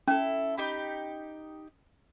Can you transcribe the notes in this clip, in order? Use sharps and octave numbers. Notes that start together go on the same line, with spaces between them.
C#4 E4 A4
D#4 G4 B5